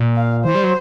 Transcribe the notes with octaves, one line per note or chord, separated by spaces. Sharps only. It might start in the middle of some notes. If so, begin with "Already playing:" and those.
Already playing: A#2
F5
E3 C5
G3
F#3